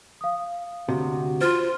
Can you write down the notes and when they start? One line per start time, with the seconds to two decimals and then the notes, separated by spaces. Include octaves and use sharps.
0.21 F5 D#6
0.89 D2 A2 C3 F#4
1.41 F4 C5 F6 A6